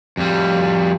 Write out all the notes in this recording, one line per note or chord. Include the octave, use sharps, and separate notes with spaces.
F2 G3